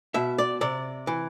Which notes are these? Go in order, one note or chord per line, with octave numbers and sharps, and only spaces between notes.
B2 E5
D5
C3 D5
E3